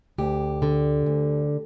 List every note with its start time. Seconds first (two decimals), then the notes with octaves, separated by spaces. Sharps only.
0.18 D2 G4
0.62 D3
1.06 D2